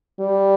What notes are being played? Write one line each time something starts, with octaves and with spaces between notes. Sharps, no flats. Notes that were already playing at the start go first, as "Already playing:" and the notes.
G3